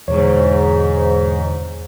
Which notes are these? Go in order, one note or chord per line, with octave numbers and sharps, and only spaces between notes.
E2 G#2 B2 D3 C#5